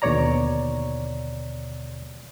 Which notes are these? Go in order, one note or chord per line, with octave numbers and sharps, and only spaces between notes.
D#2 B2 D3 C#5 D5 A#5